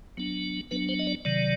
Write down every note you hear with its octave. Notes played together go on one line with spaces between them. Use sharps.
F#3 B3 D4
F#3 B3 D4 B4
C5
D#5
D5
C3 D#3 F#3 D5